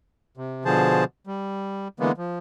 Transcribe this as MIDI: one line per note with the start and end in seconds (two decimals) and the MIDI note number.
0.37 0.64 48
0.65 1.04 47
0.65 1.04 50
0.65 1.04 53
0.65 1.04 68
0.65 1.04 72
0.65 1.04 81
1.27 1.88 55
2.00 2.12 50
2.00 2.12 52
2.00 2.12 56
2.00 2.12 58
2.00 2.12 59
2.18 2.39 53